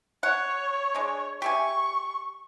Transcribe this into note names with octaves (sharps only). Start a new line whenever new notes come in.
C#5 F#5
G#3 D4
G4 E5 G#5 C#6